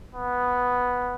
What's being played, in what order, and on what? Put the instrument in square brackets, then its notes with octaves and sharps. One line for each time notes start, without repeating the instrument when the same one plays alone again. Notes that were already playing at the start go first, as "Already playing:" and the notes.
[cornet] B3